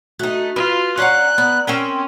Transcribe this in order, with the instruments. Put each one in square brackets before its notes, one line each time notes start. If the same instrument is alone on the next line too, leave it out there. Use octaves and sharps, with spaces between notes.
[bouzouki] A3 D#4 [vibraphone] F#4
[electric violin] F4 [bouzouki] B4
[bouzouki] C#4 F5 F#5 [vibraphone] D5 A#5 [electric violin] F#6
[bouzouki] B3
[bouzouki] C4 A#4 G5 [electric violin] C#4